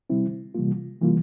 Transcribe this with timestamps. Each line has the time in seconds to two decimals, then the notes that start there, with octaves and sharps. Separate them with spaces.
0.10 C3 G3 C4 E4
0.55 C3 E3 G3 A#3 F4
1.01 C3 E3 G3 A#3 F4